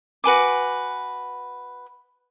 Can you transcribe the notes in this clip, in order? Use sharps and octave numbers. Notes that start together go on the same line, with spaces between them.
F#4 B4 G#5 D6